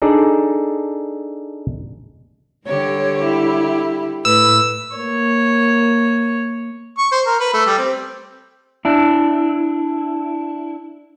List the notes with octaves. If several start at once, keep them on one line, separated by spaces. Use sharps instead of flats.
D4 D#4 G#4 A4 D5
D3 G3 G4 C#5
E4
A2 B4 E6
A#3 C#5
C#6
C5
A#4
B4
A3
G3
C4
D4 E4